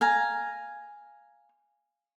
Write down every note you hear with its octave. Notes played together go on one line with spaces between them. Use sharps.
F5 G#5 A#5